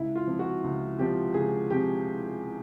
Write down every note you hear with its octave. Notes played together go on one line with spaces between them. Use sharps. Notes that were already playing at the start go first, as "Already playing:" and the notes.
Already playing: C#2 E4
F4
C3 F3
F#4
C#2
C3 F3 G4
C#2 G#4
C3 F3 G4